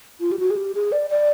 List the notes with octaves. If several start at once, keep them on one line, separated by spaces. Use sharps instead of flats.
F4
G4
F#4
G#4
G4
G#4
D5
D5